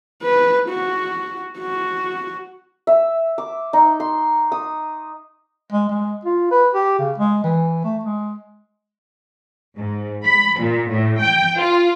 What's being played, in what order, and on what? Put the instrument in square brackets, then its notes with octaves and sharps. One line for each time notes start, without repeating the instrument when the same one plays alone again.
[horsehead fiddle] B4
F#4
F#4
[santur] E5
D6
D#4
C6
D#6
[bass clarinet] G#3
G#3
F4
B4
G4
C#3
G#3
E3
A3
G#3
[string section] G#2
B5
A#2
A2
G5
F4